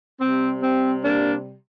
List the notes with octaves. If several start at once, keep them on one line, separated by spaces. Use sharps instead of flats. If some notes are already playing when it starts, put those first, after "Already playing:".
C3 G3 C4
C4
A#3 D4